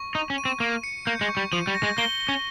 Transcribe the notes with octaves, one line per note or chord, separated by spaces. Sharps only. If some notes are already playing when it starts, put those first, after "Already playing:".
Already playing: C#6
D#4 D#7
C#4
D#7
C4
A#3 C#6
C#7
A#3 G6
G#3
C#6
G3
F3 D#7
G3
A#6
G#3
A#3 G7
G7
C#4